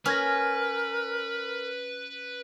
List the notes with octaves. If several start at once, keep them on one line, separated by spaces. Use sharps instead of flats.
C#4 A#4 B4 F6 G#6 A#6